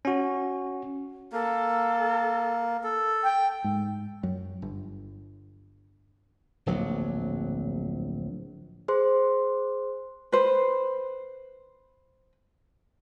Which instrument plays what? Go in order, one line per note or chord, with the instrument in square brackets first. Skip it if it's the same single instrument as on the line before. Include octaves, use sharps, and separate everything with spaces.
[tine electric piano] C#4 F#4
[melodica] A#3 [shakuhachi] A4
[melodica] A4
[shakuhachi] G5
[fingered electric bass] G#2
F#2
G1
[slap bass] D1 A#1 F#3
[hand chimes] G#4 C5 C6
[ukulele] B4 C5